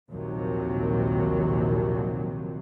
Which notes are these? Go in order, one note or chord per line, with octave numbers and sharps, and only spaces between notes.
A#1 D#2 C3 F#3